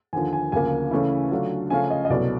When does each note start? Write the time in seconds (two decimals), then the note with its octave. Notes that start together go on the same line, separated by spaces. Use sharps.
0.13 D#2 D3 F3 G#5
0.33 G#5
0.52 D2 C#3 F3 A#3 G#5
0.91 C#3 E3 A3 C#4 E4
1.31 D3 F#3 A3 D4 F4
1.70 C#3 F3 A3 C#4 F4 G#5
1.90 D#5
2.05 D#5
2.10 C2 B2 F#3 A3 D5